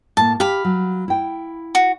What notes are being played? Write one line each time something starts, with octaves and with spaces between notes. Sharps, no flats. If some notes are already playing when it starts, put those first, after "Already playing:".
A2 A#3 A5
G4 F5 B5
F#3
E4 G5
F#4